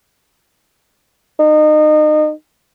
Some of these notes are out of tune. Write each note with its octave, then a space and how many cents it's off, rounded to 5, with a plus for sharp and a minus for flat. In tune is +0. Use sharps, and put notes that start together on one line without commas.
D#4 -30